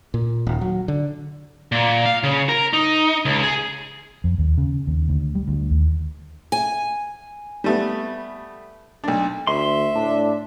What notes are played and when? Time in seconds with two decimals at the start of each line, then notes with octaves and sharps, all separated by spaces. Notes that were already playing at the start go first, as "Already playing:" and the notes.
0.14 A#2
0.47 D#1
0.61 F#3
0.88 D3
1.72 A#2
2.06 F5
2.23 C#3
2.49 A#4
2.73 D#4
3.25 C#2
3.43 G#4
4.24 F2
4.38 D#2
4.58 C#3
4.87 D#2
5.09 D2
5.35 G3
5.48 D2
5.71 D#2
6.52 G#5
7.64 G3 A3 B3
9.04 B1 D4
9.47 D2 E5 C6
9.95 A2 D4